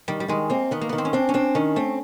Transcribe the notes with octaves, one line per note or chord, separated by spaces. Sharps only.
D#3 G3
G3
D#3 G#3
A#3 C4
D#3 B3
A#3
D#3 B3
C4
C#4
C4 D4
C#4
C4 D4
D#3 C#4
A3 C4